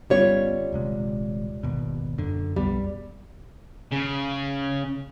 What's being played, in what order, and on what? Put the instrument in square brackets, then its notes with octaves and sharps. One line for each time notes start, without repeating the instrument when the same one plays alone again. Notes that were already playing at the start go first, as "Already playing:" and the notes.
[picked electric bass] G1 B3 C#4 [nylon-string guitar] G3 F4 C#5
[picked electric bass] D#1 C3 G#3
G#1 D#2 B2
F#2 D3
[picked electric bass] B1 F2 B3 [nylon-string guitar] G3
[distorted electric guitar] C#3